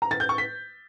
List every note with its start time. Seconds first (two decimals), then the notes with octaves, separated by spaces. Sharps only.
0.02 A#5
0.11 A6
0.20 G6
0.29 C#6
0.38 B6